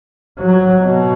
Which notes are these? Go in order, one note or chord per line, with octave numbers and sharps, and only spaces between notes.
F#3
B2